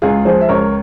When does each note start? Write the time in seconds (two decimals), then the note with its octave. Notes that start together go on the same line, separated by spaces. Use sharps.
0.02 C#2 F4 G#4
0.25 F3 G#4 C5
0.41 E5
0.49 C#2 A#4 C#5